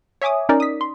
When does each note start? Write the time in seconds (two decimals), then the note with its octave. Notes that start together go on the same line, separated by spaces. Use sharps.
0.22 C#5 E5 G#5 D6 D#6
0.49 C#4 D#4 A#4 D5
0.60 D#6 B6
0.81 C6